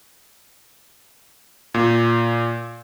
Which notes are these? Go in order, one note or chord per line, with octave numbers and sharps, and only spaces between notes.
A#2